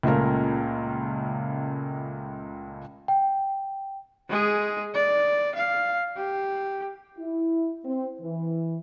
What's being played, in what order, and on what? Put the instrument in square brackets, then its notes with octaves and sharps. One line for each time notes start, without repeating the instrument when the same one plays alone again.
[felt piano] C#2 A#2 A3 C#4 A#4
[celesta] G5
[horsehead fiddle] G#3 G#4
D5
F5
G4
[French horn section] E4
C4
E3